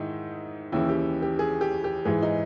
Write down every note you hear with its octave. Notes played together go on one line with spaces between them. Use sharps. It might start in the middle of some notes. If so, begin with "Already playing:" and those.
Already playing: G#2 D#3 D#4 E4
D#2 C#3 E3 E4
G4
G4
G#4
G4
G4
G#2 E3 G#4
D#4